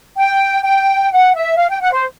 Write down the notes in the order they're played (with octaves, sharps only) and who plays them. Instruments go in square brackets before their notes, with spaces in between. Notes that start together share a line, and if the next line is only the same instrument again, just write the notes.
[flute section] G5
G5
F#5
E5
F5
G5
F#5
C5